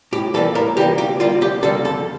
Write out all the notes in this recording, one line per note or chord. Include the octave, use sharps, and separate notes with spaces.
A2 G4
E3 G3 A#3 A4
A2 A#4
E3 G3 A#3 G4
D2 G4
D3 G3 A#3 F4
D2 G4
D3 G3 A#3 A4
F2 A4